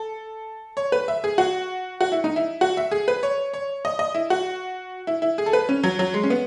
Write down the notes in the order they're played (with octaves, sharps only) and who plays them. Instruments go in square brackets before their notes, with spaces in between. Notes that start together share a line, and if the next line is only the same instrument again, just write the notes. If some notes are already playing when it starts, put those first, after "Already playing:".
Already playing: [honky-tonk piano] A4
C#5
B4
E5
G#4
F#4
F#4
E4
D#4
E4
F#4
E5
G#4
B4
C#5
C#5
D#5
D#5
E4
F#4
E4
E4
G#4
A4
B4
C#4
F#3
F#3
G#3
C#4
B3